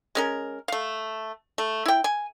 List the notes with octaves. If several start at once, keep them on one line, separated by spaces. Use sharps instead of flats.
G#3 C#4 A#4
A3 F5
A3
E4 G5
G#5